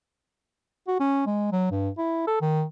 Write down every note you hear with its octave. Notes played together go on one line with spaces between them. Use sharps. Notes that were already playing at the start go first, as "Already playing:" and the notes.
F#4
C#4
G#3
F#3
G2
E4
A4
D#3